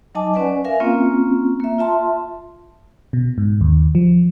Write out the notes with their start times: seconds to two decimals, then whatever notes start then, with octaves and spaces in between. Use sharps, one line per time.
0.15 F#3 D#4 D#5 G#5 A5 D6
0.34 C#4 B4 D5 F#5 G#5
0.64 A#4 E5 F5 G#5
0.80 A#3 C4 C#4 F4
1.60 A#3 E5
1.78 F4 E5 A5 C6
3.13 B2
3.38 G#2
3.61 D#2
3.95 F3